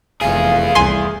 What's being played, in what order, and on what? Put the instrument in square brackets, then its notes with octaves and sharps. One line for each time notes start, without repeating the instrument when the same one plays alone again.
[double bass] F1 [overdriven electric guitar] E2 G#4 [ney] F5
[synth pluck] C2 G#5 C6